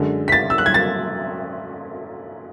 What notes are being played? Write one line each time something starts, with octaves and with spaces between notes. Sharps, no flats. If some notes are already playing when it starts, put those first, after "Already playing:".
Already playing: F#2 D3 G#3
B6
A6
E6
F#6
G#6
A6